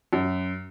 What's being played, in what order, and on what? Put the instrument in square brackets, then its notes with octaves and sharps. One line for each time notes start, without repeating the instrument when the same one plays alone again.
[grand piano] F#2